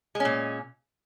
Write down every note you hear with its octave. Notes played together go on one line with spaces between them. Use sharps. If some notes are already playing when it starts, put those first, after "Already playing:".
A#2 G#3 C#4